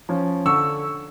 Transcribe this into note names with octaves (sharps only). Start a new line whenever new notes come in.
F3 C#4
D3 C#6 E6